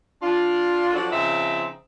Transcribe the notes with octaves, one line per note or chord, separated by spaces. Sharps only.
D4 F4
F3 F#3 D4 F#4 A4 D5
C#3 F3 C4 D#4 E5